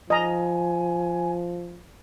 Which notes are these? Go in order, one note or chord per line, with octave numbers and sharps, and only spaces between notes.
F3 D#5 G#5 A#5